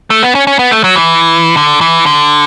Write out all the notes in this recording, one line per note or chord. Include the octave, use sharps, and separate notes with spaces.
A3
B3
C#4
C#4
B3
A3
F#3
E3
D3
E3
D3